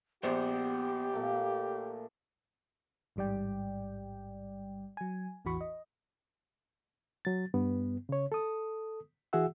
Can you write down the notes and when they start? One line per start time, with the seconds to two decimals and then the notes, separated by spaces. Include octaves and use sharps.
0.23 A#1 B3 G4 C5
1.14 A#2 A3 A#4
3.16 A1 G#2 G3 D5 G5
4.97 F#3 G#5
5.45 A1 E2 E3 F#4 B5 C#6
5.61 D#5
7.25 F#3 A6
7.54 G2 B3
8.09 C#3 C#5
8.32 A4 D#6
9.33 E3 F#4 G#4 E5 F#5 E6